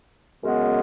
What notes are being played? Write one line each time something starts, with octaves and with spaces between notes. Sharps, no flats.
F#2 C#3 G#3 B3